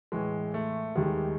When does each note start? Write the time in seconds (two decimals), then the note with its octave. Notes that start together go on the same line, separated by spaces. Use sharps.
0.12 A2 E3 G#3
0.54 A3
0.96 D#2 D#3 G3 G#3